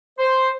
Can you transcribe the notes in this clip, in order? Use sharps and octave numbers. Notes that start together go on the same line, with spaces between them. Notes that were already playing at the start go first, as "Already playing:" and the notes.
C5